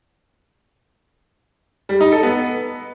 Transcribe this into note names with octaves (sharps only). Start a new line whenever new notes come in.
G3
D#4
A4
B3